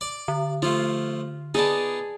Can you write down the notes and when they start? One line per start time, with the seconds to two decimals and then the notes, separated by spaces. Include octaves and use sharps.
0.01 D5 D6
0.28 D3
0.62 F3 A3 F4
1.54 B3 D#4 G#4 D5 A5